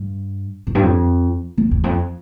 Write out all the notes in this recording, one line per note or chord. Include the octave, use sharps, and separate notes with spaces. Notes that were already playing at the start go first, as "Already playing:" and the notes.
Already playing: G2
F2
G2
F2
F2
E2
F2